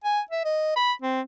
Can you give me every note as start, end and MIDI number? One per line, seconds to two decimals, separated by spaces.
0.05 0.21 80
0.31 0.44 76
0.45 0.72 75
0.76 0.93 83
1.02 1.21 60